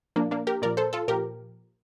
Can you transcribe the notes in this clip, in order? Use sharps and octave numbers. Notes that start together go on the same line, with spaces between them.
A#2 F3 A#3 D4
A#3 D4
G4 A#4
A#2 F3 A#4 D5
A4 C5
F4 A4
A#2 F3 G4 A#4